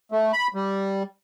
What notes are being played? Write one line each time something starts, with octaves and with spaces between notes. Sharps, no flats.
A3
B5
G3